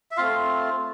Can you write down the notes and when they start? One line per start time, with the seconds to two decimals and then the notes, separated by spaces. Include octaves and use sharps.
0.11 E5
0.17 A3 C4 F4 F5